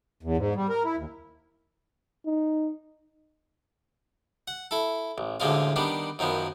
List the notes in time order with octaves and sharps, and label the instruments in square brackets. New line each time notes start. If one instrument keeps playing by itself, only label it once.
[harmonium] E2
G#2
G3
A#4
E4
D#2
[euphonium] D#4
[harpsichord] F#5
E4 A4
A1
A1 D2 D3 F3 G#3 F4
D#3 G3 B3 D4
F#2 D#3 F3 B3